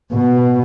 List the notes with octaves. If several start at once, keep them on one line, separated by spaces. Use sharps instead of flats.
B2